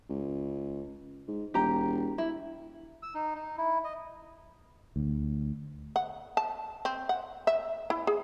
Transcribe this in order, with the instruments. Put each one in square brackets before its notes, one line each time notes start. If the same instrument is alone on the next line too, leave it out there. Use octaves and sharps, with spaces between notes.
[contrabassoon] C#2
G#2
[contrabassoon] E1 [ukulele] G4 A#5
[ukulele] E4
[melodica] E6
D#4
D#4
E4
D#5
[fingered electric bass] D2
[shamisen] F#5
A5
C4
F#5
E5
E4
G#4